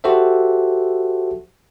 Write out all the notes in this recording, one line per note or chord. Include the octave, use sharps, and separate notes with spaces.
F#4 G4 A4 C5 E5